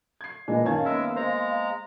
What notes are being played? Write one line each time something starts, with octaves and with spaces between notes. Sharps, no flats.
G#6 C7
A#2 E3 G#3 D4 D#5
F#2 D#3 C#4 F5 A5 G#6
G#3 A#3 B3 A#4 E5
G#3 C5 A#5